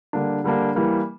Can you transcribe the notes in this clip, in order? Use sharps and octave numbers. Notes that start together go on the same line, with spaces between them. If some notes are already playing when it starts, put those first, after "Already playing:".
D3 G3 A#3 D4
D3 G3 A#3 D4
E3 G3 A#3